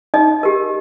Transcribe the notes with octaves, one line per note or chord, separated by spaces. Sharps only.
D#4 D#5
G4 A#4